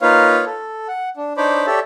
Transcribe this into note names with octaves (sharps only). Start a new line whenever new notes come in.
A#3 D#4 F4 B4 C#5 F5
A4
F#5
D4
D4 D#4 C5 C#5 B5 D6
G4 A4 C#5 D5 E5